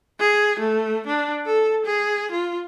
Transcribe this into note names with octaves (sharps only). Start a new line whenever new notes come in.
G#4
A3
D4
A4
G#4
F4